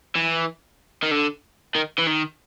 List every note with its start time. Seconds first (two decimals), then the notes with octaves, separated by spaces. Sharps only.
0.15 E3
1.03 D#3
1.11 D3
1.75 D#3
1.98 E3
2.06 D#3